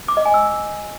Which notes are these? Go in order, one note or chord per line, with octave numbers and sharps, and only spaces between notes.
D6
D#5
G#5
E6